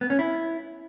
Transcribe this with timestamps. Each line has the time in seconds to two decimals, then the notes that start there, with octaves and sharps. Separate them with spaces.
0.01 B3
0.10 C#4
0.19 E4